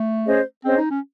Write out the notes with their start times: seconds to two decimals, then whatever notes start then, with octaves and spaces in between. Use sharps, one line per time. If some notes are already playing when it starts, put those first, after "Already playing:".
Already playing: A3
0.26 C#4 G#4 C5 D#5
0.64 C4 C#4 G#4 C5 D#5
0.77 D#4
0.90 C#4